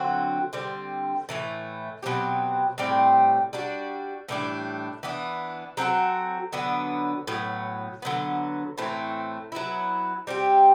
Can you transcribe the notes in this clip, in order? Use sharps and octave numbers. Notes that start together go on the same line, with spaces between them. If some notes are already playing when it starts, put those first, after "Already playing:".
Already playing: D3 F#3 C4 F#4
D3 G3 C4
A2 E3 A3
B2 F#3 C4 G4
A2 G3 C4
G3 D4 F#4
A2 E3 G3 D4
E3 B3 D4
F#3 C4 F#4 A4
D3 F#3 B3
A2 F#3 B3
D3 F#3 B3
A2 E3 A3 C4
F#3 B3 E4
G3 C4 G4